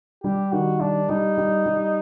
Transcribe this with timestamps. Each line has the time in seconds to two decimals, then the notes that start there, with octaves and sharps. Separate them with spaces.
0.24 G3 G4
0.52 D#3 F#4
0.81 G3 D4
1.09 G3 D#4
1.38 G3
1.66 G3